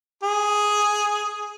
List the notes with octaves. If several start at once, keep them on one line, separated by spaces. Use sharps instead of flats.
G#4